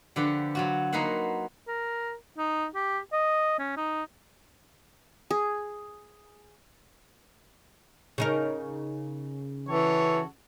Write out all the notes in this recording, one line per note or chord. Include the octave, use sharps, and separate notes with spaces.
D3 F3 G4 B4 F#5
F#3 F4 F#4
A#3 D#4 F#4 B4 C5 F#5
A#4
D#4
G4
D#5
C#4
D#4
G#4
C#3 D#4 A#4
E3 F#4 A4 C#5